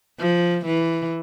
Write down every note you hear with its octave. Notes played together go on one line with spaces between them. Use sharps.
F3
E3